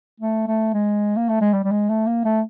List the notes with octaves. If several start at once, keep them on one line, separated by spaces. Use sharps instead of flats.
A3
A3
G#3
A#3
A3
G#3
G3
G3
G#3
A3
A#3
A3